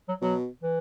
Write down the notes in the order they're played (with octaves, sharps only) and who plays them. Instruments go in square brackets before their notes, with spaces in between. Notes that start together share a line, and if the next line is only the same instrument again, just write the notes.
[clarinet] F#3
[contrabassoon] B2 [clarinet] F#3
[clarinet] E3